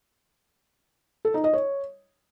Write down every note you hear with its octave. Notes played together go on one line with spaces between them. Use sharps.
A4
D#4
D#5
C#5